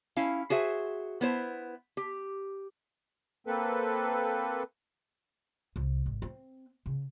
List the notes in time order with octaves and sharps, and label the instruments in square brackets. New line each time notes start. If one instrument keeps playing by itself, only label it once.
[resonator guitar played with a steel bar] C#4 E4 F5
F#4 G#4 C5 E5
B3 E4 C5
G4
[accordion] A#3 C4 A4 B4
[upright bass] C2
G#1
C4
C#3